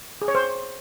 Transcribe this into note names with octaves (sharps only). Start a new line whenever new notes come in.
G#4
C#5
C5